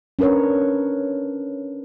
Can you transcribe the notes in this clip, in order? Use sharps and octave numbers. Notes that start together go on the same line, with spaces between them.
C#4 D4 A#4 B4 C#5